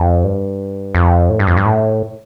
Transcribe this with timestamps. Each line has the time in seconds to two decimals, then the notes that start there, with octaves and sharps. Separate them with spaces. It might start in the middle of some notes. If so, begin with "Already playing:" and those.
Already playing: F2
0.24 G2
0.95 F2
1.30 A2
1.39 G2
1.47 F2
1.57 G2
1.65 A2